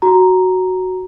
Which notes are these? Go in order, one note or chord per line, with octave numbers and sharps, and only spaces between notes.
F#4 A#5